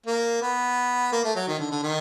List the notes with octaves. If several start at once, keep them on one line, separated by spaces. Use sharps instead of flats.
A#3
B3
A#3
A3
F#3
D#3
D3
D3
D#3